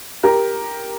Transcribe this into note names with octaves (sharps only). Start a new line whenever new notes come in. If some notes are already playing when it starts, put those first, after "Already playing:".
G4 A#4